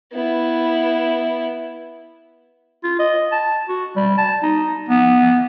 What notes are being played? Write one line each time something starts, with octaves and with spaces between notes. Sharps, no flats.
B3 E4
F4
D#5
A5
F#4
G3
A5
D#4
B3